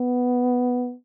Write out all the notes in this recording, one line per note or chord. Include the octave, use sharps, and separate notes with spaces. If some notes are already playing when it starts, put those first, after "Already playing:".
Already playing: B3